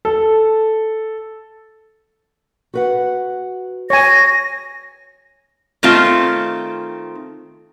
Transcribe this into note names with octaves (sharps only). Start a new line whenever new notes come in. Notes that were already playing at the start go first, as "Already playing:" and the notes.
A4
F#4 B4 F#5
C#5 G#5 A#6
D#3 A3 C4 F4